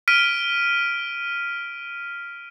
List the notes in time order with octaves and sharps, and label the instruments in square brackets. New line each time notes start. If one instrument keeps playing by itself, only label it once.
[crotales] F6 B6 D7 D#7